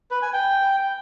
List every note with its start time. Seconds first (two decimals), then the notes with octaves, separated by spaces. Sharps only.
0.11 B4
0.22 G#5
0.33 G5